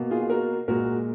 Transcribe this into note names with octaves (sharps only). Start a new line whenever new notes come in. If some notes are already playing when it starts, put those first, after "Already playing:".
Already playing: B2 A#3
F4 G#4
F#4 A#4
A#2 G#3 F#4 A#4